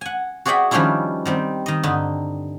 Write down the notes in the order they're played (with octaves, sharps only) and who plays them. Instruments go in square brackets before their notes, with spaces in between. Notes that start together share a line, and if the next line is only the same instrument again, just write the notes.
[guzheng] F#5 G#5
F#4 G#4 D5 E5 F#5 G5
D#3 F3 G3 C#4 D4 E4
D#3 G3 C4
D#3 D#5
G2 D3 D#4